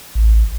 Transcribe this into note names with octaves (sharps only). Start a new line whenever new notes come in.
A1